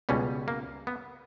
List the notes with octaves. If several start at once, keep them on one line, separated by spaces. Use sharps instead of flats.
C#2 B2 G3 C#4
A#3
B3